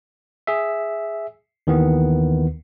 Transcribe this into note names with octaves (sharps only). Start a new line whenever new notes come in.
G#4 E5
D#2 D#3 E3 B3